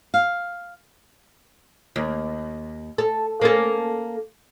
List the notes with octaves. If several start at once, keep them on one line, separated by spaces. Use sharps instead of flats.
F5
D#2
A4
A#3 C#4 A4